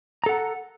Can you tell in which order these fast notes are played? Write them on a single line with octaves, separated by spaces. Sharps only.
A#5 A4 F#5